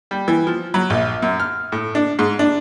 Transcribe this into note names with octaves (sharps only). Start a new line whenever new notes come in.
G3
E3
F3
F#3
A#1
F#2
F6
A2
D4
G#2
D4